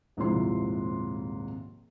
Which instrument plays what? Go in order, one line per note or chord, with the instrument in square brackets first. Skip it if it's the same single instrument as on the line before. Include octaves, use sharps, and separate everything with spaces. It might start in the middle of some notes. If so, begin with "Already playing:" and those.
[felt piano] D#1 G#2 C3 F3 E4 C6